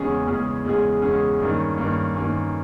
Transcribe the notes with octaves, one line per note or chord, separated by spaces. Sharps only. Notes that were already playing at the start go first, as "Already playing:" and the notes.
Already playing: E2 C#3 G#3 C#4 G#4
E2 C#3 G#3 C#4 G#4
E2 C#3 G#3 C#4 G#4
E2 C#3 G#3 C#4 G#4
G2 D#3 A#3 C#4
G2 D#3 A#3 C#4
G2 D#3 A#3 C#4